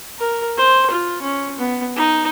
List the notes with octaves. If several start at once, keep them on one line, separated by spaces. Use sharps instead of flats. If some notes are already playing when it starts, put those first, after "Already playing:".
A#4
C5
F4
C#4
B3
D#4